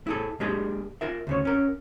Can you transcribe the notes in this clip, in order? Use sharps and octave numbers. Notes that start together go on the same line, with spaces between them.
E4 G#4 A4
G#3 A#3 D4 G4 G#4
F4 A#4 E5
D2 C#3 C#5
C#4 A#4